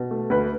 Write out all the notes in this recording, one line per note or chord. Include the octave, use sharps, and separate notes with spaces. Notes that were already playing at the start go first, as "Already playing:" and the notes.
Already playing: B2
A3
D2 B4